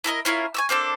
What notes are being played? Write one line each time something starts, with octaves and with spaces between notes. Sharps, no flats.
E4 A4 A#4 D#5
C#4 E4 F4 A#4
G#5 C#6 E6
A#3 C4 D4 A4